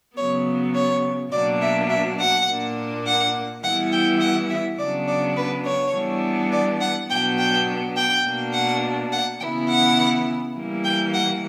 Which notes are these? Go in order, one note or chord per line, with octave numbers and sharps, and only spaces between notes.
C#3 F#3 B3 C#5
C#5
B2 F#3 A#3 D4 D5
E5
E5
F#5
A#2 A#3 D4
F#5
E3 G3 B3 E4 F#5
G5
F#5
E5
C#3 F#3 B3 D4 D5
D5
B4
C#5
E3 G3 B3 D4
D5
F#5
B2 F#3 B3 D4 G5
G5
G5
B2 A#3 D4
F#5
F#5
C#3 E3 B3 E4 G5
F#5
E3 G3 A#3
G5
F#5